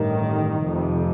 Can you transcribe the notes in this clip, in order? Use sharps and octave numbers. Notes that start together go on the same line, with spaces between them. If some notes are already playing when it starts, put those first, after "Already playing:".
Already playing: A1 G2 D#3
F1 F2 C3